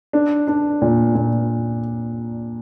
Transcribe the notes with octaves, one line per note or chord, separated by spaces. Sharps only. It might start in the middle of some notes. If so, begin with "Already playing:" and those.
D4
D4
A#2
A#2